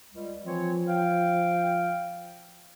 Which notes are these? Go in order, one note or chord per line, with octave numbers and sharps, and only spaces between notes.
C#2 G3
E3 F3 C4 C#5
F5 G5